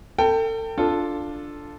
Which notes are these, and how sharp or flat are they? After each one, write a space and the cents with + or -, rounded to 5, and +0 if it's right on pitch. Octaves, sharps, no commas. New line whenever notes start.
A4 +35 G5 +0
D4 +0 F4 +0 A4 +0